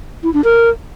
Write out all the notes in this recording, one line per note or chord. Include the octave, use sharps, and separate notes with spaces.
E4
D4
A#4